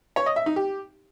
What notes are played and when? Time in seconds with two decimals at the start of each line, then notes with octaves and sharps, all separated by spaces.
0.16 C#5
0.26 D#5
0.36 E5
0.46 D#4
0.56 G4